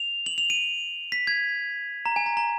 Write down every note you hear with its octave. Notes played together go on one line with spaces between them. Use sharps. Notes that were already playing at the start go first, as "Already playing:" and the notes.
Already playing: F7
F#7
F7
D#7
B6
G#6
A#5
G#5
A#5
A#5